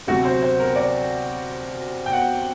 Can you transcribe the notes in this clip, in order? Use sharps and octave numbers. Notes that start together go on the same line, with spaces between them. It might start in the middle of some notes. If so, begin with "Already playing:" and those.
D2 C3 F#3 F#4
C5
C5
A#4
D5
G5
F#5